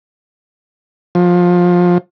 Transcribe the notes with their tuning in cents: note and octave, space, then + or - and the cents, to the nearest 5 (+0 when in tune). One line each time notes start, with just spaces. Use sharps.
F3 +20